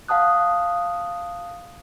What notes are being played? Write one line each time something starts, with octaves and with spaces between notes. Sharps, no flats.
F5 F#5 A5 D#6 F#6